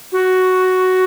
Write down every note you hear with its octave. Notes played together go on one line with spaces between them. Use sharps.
F#4